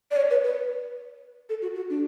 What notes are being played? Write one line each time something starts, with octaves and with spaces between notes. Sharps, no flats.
D5
C#5
B4
B4
A4
F#4
F#4
D4